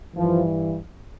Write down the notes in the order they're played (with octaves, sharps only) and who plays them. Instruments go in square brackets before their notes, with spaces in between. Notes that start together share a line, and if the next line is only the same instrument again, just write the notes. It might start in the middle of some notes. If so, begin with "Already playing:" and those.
[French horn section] G2 E3 F3